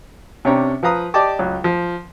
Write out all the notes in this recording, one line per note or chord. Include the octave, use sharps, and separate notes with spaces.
C3 C#4 D4 C#5 G5 A#5
F3 B4 F5 A#5 D#6
G4 D5 D#5 G5 A5 D6
C#2 F#3
F3